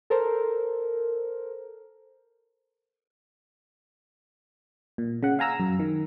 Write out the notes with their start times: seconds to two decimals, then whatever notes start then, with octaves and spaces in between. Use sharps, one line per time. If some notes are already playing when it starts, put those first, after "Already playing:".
0.10 A4 A#4 C5
4.98 A#2
5.23 C#3 F#5
5.39 F5 G#5 A#5 E6
5.60 F#2
5.79 D#3